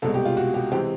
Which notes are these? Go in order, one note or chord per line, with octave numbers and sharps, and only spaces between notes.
C2 B2 G#3 A4
G4
F4
F#4
G4
C3 E3 G#3 G4